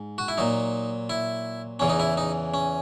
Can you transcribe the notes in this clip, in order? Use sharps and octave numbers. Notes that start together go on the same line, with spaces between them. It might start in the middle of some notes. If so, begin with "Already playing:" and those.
Already playing: G#2
F#4
E4
A#2 F#3 D#4
E4
E2 C#3 E3 C#4
D#4
E4
D#4
C#4